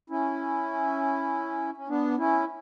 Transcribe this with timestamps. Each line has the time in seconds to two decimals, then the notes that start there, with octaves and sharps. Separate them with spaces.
0.10 C#4 E4
1.77 C#4
1.88 B3 D4
2.18 C#4 E4